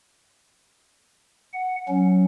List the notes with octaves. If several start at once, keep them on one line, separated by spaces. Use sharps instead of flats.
F#5
F#3 C#4